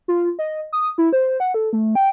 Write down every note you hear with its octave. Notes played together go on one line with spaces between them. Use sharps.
F4
D#5
D#6
E4
C5
F#5
A4
A3
G5